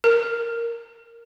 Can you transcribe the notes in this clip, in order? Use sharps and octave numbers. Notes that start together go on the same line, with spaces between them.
A#4